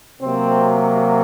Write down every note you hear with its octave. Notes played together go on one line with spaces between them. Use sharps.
C3 F#3 A#3 C4